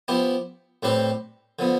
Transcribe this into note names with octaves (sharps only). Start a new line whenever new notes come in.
F3 B3 E4 G4
A2 G3 C4 G4 B4
D3 F3 B3